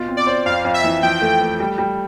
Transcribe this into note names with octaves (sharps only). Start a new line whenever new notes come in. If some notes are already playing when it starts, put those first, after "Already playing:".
Already playing: B2 F4
C4
D5
C5
F2 F5
F2
E5
E3
F3 G5
A3
A3
G3
G3